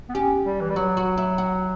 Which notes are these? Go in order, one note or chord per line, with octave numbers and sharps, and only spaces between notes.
B3
C#4 G4
G3
E3
G3
F#3 F#4
F#4
E4
F#4